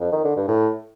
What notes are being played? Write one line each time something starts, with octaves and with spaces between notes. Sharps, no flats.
F2
D#3
D3
G2
A2